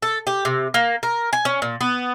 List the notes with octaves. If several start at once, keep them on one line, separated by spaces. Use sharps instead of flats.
A4
G4
C3
A#3
A#4
G#5
C#4
A#2
B3